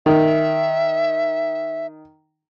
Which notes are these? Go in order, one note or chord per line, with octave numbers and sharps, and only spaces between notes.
D#3 E5